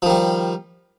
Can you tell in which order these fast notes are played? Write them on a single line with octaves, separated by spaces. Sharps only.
F3 D#3 G3